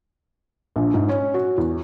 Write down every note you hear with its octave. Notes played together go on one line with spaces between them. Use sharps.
A#1
G#2
C#4
F#4
E2